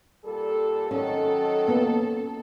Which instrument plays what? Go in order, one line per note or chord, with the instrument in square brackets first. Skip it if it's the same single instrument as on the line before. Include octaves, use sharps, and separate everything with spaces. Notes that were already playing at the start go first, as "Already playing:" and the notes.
[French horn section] A#2 G3 A4
[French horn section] D#3 F#3 [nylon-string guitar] C#4 [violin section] A4
[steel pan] A#3 B3